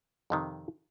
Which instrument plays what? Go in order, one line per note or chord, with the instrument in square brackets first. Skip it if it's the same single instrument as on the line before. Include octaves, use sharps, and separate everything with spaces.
[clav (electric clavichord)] F2 C3 D#3